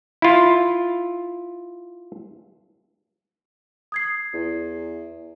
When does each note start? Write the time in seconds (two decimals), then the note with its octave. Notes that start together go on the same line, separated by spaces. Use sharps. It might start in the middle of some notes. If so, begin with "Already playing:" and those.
0.22 E4 F4
3.92 D#6 G#6 C7
4.33 E2